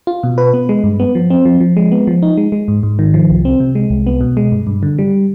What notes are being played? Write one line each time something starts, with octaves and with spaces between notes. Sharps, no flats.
F4
B2
B4
B3
G#3
G2
B3
F3
C4
F3
F3
G#3
B3
F3
D#4
G#3
G#3
G#2
G#2
D#3
F3
C2
C4
C3
G#3
C2
B3
B2
G#3
G2
G2
D3
G3